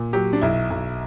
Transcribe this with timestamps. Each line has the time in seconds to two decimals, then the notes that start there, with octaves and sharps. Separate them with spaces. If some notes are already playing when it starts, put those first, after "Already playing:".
Already playing: A#2
0.13 F#3 G4
0.33 D4
0.42 B1 E4
0.70 B1